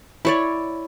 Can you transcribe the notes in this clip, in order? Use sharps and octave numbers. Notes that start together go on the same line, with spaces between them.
E4 C#5 D5